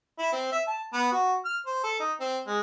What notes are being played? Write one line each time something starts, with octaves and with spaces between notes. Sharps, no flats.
E4
C4
E5
A5
B3
F#4
F6
C5
A4
D#4
C4
G#3